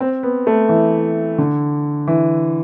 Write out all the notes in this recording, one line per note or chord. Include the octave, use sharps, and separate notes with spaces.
C4
B3
A3
E3
D3
E3